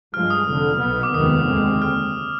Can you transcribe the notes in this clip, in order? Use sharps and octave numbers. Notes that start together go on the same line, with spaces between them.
G2 F3 G#3 F6
D#6
F1 F2 D3
B1 B2 B3
D6
F1 D#2 D#3 G#3 B3 D#6
D#2 D3 G#3 C4
F6